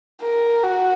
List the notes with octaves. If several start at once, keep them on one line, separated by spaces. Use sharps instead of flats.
A#4
F#4